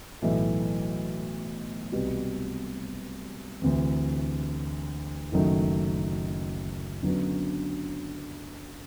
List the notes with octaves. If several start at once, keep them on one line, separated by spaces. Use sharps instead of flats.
B1 A2 E3 A3
C2 B2 G3 B3
D2 C3 E3
F#1 F#2 D#3 F#3 A3
F#2 D3 F#3 B3 D4